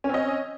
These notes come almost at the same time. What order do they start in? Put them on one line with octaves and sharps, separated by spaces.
C#4 C4 D#5